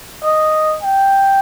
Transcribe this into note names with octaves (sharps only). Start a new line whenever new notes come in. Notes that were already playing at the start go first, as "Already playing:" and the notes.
D#5
G5